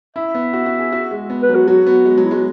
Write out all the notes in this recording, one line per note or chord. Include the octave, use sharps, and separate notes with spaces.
E4 E5
B3
F#4
F#4
G#4
F#4
G#3
B3
B4
F#3
F#4
F#3 F#4
B3
G#3
F#3
E4
G#3 F#4